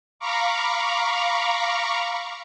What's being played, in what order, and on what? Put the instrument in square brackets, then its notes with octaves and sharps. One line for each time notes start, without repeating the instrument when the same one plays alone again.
[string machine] F5 A#5 B5 C#6 D6